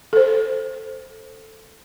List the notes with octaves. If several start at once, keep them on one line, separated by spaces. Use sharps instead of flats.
A4 C5